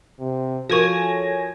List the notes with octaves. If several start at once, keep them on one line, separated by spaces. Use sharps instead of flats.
C3
F3 F#4 A4 A#4 C#5 G#5 A#6